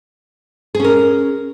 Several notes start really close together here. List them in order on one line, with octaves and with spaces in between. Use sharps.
G#4 C#4 A#4